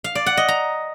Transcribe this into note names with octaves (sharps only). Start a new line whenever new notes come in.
F5
D5
F#5
D#5
A#5